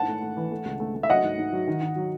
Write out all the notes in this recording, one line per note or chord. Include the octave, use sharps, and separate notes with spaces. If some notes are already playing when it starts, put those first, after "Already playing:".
Already playing: G#2 E4 F#5 A5
A3
A3
E3
A3
C#2
A3
A3
E5
F#3 D#5 F#5
G#2
G#2
F#3
D#3
D#3
F#3